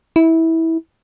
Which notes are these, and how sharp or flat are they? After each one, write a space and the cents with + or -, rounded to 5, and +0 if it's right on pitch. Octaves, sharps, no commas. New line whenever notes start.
E4 -20